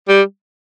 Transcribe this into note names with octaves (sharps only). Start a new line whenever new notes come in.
G3